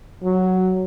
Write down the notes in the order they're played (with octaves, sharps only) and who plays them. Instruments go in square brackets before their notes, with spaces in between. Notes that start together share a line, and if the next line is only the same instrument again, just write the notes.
[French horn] F#3